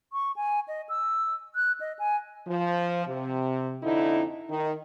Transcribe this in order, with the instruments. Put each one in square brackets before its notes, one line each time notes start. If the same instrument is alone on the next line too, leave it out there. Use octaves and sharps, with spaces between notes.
[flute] C#6
G#5
D#5
E6
F#6
D#5
G#5
[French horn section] F3
C3
F2 D3 D#4 E4
D#3 D#4